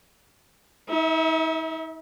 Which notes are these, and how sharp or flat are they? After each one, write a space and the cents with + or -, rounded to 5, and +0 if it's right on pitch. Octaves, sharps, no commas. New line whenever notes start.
D#4 +45 E5 -20